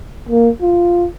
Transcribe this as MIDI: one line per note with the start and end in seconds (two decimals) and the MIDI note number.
0.29 0.49 58
0.62 1.07 65